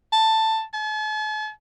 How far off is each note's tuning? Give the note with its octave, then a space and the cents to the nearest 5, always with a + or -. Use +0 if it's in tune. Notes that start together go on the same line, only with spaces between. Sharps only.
A5 +10
A5 -45